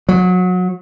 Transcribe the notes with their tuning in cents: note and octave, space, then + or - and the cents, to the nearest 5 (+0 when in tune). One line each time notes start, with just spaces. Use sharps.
F#3 -25